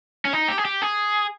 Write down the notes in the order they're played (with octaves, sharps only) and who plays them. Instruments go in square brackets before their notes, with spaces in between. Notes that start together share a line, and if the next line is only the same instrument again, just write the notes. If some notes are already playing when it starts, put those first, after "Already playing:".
[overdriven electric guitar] C#4
D#4
G4
G#4
G4
G#4